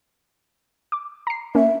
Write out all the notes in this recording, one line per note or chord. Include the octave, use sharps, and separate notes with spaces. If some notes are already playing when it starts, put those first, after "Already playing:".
D6
A#5 C7
A#3 C#4 E5